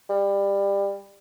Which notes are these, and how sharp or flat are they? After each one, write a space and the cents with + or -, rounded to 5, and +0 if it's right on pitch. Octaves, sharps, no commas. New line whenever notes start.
G3 +20